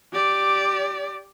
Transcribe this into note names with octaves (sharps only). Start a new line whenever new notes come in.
G4 D5